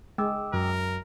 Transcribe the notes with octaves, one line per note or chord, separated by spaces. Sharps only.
G#3 G5 D6 E6
F#2 A#4